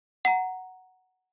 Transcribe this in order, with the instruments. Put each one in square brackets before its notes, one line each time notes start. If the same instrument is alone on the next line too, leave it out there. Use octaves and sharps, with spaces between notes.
[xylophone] F#5 A#5